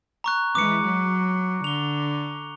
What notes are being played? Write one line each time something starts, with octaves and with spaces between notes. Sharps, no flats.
A#5 C#6 F#6
E3 G#3 D6 C#7
F#3
D3 F7 G7